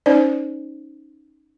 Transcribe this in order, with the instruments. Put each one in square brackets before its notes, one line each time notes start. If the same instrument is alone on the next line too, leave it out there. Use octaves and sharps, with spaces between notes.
[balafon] C#4 D#4 C5 D5